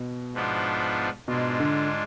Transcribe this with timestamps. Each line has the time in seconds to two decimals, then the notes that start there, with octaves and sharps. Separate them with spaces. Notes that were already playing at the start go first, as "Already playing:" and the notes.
Already playing: B2
0.34 G#2 F3 B3 D4 F4
1.28 G#2 B2 G#3 D4 F4
1.60 D3